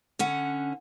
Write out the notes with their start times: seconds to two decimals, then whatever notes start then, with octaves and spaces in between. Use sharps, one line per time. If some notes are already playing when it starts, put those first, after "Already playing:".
0.19 D3 C#4 F#5